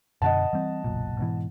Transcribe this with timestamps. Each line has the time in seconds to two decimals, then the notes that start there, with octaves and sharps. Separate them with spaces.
0.22 F#2 B2 D3 D#5 F#5 A5
0.53 E3 G3 C4
0.84 F#1 B1 A#2
1.19 G#2 B2 E3